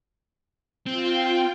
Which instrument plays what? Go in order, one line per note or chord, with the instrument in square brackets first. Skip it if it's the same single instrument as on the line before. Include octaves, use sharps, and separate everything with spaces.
[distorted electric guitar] C4 [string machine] F4 G5